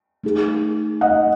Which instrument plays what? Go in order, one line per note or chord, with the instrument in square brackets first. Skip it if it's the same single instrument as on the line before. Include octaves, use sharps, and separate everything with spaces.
[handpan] A3 D#4 G#4
[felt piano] D#5 F#5